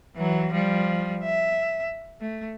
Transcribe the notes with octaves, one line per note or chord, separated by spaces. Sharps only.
E3 F#3
F3 G3
E5
A3